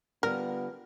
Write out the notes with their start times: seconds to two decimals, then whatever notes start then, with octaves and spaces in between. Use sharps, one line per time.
0.23 D3 G3 B3 F4 A#4